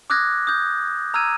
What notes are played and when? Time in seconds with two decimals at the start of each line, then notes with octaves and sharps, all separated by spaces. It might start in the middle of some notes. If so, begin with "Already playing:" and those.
0.10 D6 D#6 F6 F#6 G#6 A#6
0.47 D#6 G6
1.14 A#5 E6 F6 G#6 D#7